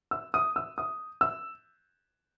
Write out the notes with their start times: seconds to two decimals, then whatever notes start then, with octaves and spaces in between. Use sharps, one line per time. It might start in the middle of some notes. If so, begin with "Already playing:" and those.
0.11 E6
0.34 D#6
0.56 E6
0.78 D#6
1.21 E6